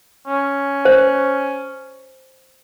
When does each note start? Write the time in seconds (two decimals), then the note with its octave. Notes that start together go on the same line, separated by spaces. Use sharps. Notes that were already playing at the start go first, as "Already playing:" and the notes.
0.27 C#4
0.85 C5